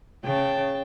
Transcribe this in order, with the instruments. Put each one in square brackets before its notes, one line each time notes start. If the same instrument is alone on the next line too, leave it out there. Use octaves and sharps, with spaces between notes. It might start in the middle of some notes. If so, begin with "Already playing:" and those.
[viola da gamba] C#3 [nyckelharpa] G5 A5